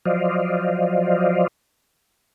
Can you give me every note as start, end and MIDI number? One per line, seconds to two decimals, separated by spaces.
0.05 1.47 53
0.05 1.47 54
0.05 1.47 72
0.05 1.47 74
0.05 1.47 75
0.05 1.47 77